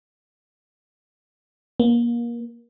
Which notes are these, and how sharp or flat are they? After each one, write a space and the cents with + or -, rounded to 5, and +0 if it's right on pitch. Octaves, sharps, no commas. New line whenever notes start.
A#3 +25